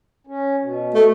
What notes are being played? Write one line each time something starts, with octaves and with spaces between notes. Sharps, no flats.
C#4
B2
A3